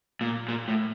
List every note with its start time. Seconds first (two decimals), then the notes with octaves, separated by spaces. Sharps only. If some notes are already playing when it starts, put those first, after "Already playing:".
0.21 A#2
0.48 A#2
0.68 A2